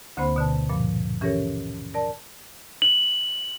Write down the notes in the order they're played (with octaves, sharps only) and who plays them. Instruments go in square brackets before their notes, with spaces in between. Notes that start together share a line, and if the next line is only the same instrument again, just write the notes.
[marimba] D2 D3 A#3 C4 C5 B5
B2 D3 A5
G2 A#2 F3
E3 C#4 G4 A4 A#4 C#5
A#4 D5 A5
[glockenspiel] F#7